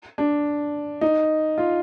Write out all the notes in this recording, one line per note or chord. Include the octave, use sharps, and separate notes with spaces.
D4
D#4
F4